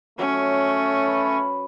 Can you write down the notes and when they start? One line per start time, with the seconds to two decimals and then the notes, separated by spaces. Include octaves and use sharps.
0.19 F#3 A3 C#4
1.07 B4